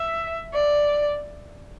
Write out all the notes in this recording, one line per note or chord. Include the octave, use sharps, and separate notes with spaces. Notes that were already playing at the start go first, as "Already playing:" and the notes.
Already playing: E5
D5